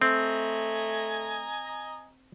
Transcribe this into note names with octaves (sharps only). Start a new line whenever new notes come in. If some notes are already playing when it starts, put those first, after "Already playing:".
A3 C4 D#5 G#5 A#5